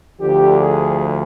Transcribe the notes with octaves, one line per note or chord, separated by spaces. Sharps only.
D2 D3 F3 G4
G#4